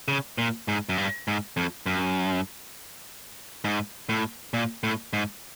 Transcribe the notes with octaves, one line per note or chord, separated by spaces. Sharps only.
C#3
A#2
G#2
F#2
G2
G#2
F2
F#2
G#2
A2
A#2
A2
G#2